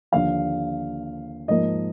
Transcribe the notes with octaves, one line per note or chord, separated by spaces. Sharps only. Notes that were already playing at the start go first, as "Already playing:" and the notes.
D#2 D3 F3 F5
G#2 F3 A#3 D#5